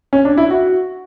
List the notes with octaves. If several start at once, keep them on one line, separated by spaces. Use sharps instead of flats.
C#4
D4
E4
F#4